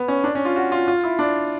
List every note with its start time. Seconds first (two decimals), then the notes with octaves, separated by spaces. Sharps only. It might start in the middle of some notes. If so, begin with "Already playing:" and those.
Already playing: B3
0.08 C#4
0.24 D4
0.35 C#4
0.45 F4
0.56 F#4
0.72 F4
0.88 F4
1.04 E4
1.19 D4